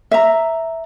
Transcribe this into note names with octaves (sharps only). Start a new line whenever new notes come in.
E5 A#5